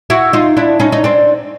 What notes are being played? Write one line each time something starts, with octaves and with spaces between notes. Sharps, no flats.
E4 F#4
D#4 F4
D4 E4
C#4 D#4
D#4
C4 D4